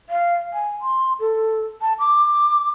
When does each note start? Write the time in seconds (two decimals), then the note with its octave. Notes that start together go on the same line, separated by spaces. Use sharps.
0.09 F5
0.53 G#5
0.82 C6
1.20 A4
1.81 A5
1.99 D6